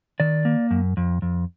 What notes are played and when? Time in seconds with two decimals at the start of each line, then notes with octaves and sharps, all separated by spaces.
0.20 D#3 D5
0.45 A#3
0.71 F#2
0.97 F2
1.22 F2